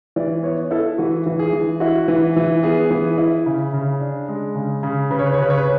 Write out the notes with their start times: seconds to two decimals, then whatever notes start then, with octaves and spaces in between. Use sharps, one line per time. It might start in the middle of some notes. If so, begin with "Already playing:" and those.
0.16 E3 D5
0.43 B3 C#5
0.71 E4 A4
0.98 E3 F#4
1.26 E3
1.39 G#4
1.53 E3
1.80 E4 F#4
2.08 E3
2.36 E3
2.63 B3 G#4
2.90 E3
3.18 E4
3.46 C#3
3.73 C#3
4.01 D4
4.29 G#3
4.55 C#3
4.83 C#3
5.11 C#3 B4
5.19 C#5
5.26 B4
5.34 C#5
5.39 C#3 B4
5.50 C#5
5.58 B4